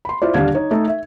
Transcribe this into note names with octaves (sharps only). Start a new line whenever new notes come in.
B5 C6
E4 F4 C5 D5
D#1 D3 G3 D4 F5 G#6
D#4 C#5 D#5
A3 D#4 A4
E5